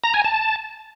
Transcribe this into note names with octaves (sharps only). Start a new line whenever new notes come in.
A#5
G#5
A5